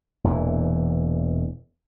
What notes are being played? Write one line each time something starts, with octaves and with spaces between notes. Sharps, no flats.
E1 E2 A#2 E3